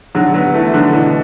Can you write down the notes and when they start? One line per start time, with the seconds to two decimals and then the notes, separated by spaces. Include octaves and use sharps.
0.15 D3 F#3
0.34 F#3 B3
0.54 E3 A3
0.74 D3 F#3
0.93 B2 E3